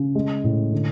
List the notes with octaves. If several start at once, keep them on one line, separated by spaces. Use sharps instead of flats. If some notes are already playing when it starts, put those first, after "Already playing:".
Already playing: C#3
G#3
A2
D3